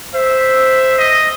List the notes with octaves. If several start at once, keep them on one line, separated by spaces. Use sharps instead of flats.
C5 E5
D#5